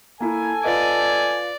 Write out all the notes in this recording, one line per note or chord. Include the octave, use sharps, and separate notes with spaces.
A#3 E4 A4 G#5
F4 B4 D5 D#5